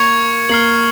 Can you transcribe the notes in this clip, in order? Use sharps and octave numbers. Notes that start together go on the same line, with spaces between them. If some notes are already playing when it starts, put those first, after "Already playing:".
Already playing: A#3 C#6 G#6 C#7 F7
A#3 F6 C7 F#7